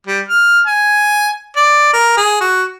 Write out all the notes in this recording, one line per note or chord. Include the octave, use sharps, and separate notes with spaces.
G3
F6
G#5
D5
A#4
G#4
F#4